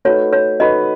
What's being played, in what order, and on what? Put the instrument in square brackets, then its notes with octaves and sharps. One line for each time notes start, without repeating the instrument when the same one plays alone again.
[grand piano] A3 D#4 F#4 B4 [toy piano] C#5
[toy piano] C#5
[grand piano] A3 D#4 F#4 B4 [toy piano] D#5